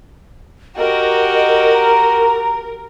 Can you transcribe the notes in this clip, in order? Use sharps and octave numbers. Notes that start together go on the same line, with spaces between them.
F#4 G4 A#4 D#5
D#5
A#5